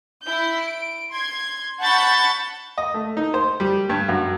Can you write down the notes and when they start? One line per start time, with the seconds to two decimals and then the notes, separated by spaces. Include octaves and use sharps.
0.22 E4 G6
0.61 D7
1.12 C6 G#6
1.81 F#5 A5 B5 C#6 G6 A6
2.78 D#5
2.94 A3
3.17 D#4
3.34 C5
3.60 G3
3.90 G2
4.09 F#2